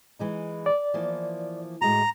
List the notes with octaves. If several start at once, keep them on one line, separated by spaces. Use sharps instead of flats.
E3 G#3 D#4
D5
E3 F3 A#3
A2 G#3 F#4 A#5